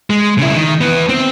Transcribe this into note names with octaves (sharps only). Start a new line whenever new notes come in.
G#3
C#3 E4
D#3
E3 B3
C4